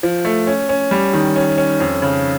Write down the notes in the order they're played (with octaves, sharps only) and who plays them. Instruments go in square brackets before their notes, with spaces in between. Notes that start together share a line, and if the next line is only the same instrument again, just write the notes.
[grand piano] F3
A3
C#4
C#4
G3
D#3
C#4
C#4
F2
C#3